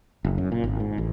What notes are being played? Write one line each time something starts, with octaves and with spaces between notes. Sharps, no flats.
F#1
F#2
A#2
G#1
G#2
A1